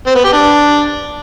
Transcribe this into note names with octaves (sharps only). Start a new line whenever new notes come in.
C4
B3
G4
D4